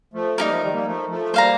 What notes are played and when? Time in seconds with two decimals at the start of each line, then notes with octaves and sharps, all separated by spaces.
0.13 F3 A3
0.38 G3 A#3 D#4 G4 A#4
0.50 F3 A3
0.62 D#3 G3
0.74 G3 A#3
0.86 F3 A3
1.09 F3 A3
1.34 G3 A#3 C5 F5 A#5